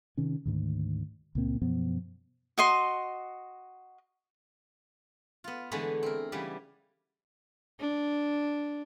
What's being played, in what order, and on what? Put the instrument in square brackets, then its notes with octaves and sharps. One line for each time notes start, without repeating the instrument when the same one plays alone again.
[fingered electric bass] C3 D#3 C#4
D2 G#2 D#3
C#2 A#2 A#3 C4
F#2 B2 F3 B3
[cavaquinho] F#4 D#5 C6
[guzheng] B3 F4
D3 E3 G#3 A3 B3
C4 A#4
C#3 E3 G3 B3
[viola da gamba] D4